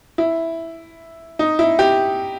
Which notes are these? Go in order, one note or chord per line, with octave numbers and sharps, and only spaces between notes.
E4
D#4
E4
G4